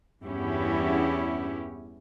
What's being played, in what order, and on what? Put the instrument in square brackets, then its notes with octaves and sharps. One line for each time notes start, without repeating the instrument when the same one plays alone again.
[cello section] E2 G2 B3 C#4 E4 G4